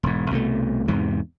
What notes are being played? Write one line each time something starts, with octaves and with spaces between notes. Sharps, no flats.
E1 G#2
C2 B2 D3 A3
E2 G#2 C3